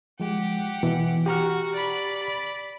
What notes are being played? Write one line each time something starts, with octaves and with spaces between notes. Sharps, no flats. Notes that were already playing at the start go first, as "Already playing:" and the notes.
F3 G#3 G4 F#5
B2 E3
F#4 G4 A#5 F6
D5 B5